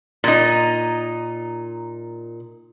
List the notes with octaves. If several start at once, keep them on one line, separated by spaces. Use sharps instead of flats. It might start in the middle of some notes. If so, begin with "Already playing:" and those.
A#2 D#4